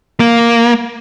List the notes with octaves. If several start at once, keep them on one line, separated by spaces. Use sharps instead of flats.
A#3